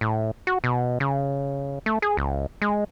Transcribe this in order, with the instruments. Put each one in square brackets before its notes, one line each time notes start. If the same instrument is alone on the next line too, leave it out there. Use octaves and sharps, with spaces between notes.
[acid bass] A2
F#4
B2
C#3
A3
G#4
C#2
G#3